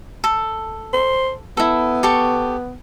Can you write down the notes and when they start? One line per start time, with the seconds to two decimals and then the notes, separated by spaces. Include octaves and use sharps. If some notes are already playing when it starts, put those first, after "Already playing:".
0.24 A4
0.93 C5
1.57 B3 E4 A4
2.03 G4 A4 C#6